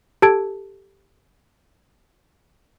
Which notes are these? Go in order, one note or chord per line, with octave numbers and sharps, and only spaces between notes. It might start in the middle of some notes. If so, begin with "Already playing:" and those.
G4 A4 A5 E6 G#6 D7